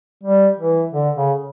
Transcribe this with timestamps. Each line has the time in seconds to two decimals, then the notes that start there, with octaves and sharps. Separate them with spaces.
0.23 G3
0.58 E3
0.93 D3
1.16 C#3